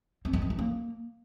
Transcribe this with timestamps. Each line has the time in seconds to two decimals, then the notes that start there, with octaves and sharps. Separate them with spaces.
0.25 C4
0.33 G#3
0.42 C4
0.50 D#4
0.59 A#3